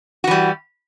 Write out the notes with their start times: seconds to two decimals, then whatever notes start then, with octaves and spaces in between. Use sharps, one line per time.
0.24 F#4
0.27 E3
0.31 G3